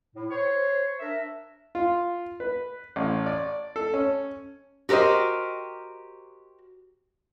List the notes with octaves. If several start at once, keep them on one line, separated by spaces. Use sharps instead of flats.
A2
C5 C#5
D4 A#4 E5
F4
B4
A1
D5
A4
C#4
F#4 G4 A#4 C5 D#5